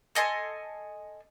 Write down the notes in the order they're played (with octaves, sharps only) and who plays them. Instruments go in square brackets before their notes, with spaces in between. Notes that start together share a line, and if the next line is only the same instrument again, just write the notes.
[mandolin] A4 D#5 G#5 C6